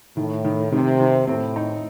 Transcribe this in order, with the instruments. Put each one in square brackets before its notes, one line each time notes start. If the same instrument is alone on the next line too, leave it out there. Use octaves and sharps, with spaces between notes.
[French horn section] A2 [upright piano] D#3
[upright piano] D#3
[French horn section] C3 [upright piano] D#3
[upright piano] D#3
[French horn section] A2 [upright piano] C4
[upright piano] D#4